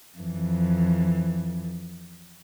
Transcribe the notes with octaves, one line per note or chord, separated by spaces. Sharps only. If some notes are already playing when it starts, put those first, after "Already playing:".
F2 E3